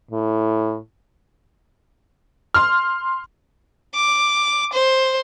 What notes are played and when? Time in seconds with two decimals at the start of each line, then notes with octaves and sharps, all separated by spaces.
0.11 A2
2.54 C6 F6
3.95 D6
4.73 C5